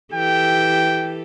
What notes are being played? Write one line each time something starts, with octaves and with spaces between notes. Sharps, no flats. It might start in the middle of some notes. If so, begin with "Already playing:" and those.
E3 G4 A4 G5